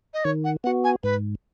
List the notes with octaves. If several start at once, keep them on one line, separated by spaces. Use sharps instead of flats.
D#5
D#3 C#5
F#5
B3 F#4 F#5
G#5
G#2 B4